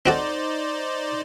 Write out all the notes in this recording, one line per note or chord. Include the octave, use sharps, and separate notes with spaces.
C4 D#4 F#4 A4 C5 D5